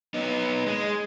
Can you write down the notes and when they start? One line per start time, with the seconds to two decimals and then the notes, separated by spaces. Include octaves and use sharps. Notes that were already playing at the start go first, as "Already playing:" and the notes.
0.14 B3 D#4
0.66 G#3